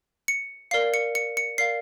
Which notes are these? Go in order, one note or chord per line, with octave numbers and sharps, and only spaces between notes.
C#7
A#4 D5 F5 C7
C#7
C#7
C#7
A#4 D5 F5 C7